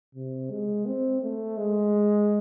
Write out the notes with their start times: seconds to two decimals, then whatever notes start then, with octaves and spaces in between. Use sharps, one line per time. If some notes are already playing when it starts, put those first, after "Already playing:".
0.15 C3
0.50 G#3
0.86 C4
1.22 A3
1.57 G#3